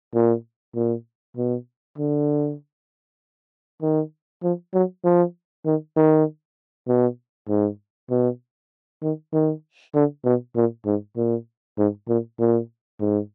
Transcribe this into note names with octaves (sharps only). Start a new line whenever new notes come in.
A#2
A#2
B2
D3
D#3
F3
F#3
F3
D#3
D#3
B2
G#2
B2
D#3
D#3
D3
B2
A#2
G#2
A#2
G#2
A#2
A#2
G#2